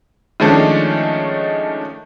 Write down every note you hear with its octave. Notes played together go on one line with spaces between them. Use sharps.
D#3 F3 G#3 A3 C#4 D4